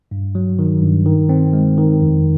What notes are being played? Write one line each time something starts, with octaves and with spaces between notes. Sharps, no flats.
G2
F#3
D#3
G2
D#3
C4
G#3
D#3
F2